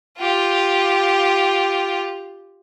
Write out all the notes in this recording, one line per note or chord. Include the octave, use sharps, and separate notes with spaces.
F4 G4